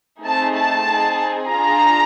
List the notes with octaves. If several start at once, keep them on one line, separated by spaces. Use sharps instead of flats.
A3 C4 D#4 G#4 A5
A5
C4 D#4 G#4
D4 F4 G#4 A#5